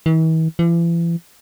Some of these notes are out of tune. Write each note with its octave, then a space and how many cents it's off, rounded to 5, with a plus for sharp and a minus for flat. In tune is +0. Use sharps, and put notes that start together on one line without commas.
E3 -45
E3 +40